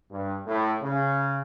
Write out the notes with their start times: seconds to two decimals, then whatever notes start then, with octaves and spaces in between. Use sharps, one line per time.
0.11 G2
0.47 A2
0.82 C#3